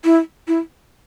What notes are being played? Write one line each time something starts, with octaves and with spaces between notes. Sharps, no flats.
E4
E4